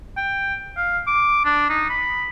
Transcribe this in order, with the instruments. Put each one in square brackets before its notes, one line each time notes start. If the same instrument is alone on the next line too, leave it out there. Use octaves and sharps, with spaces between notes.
[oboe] G5
F5
D6
D4
D#4
B5